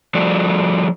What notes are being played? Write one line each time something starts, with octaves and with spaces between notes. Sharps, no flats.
F3 G3 F#4 A4 D5